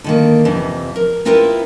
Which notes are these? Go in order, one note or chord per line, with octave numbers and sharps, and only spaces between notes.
D3 D#3 A#3
F2 C3 E3
A#4
B3 C4 E4 F4 A#4 B4